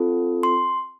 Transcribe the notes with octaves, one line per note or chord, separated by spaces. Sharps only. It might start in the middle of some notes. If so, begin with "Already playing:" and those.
Already playing: C4 F4 A4
C6